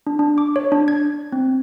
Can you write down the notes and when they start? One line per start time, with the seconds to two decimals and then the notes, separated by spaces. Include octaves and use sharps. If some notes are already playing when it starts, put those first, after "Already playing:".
0.07 D4
0.19 D4
0.38 D6
0.56 C#5
0.72 D4
0.88 G#6
1.32 C4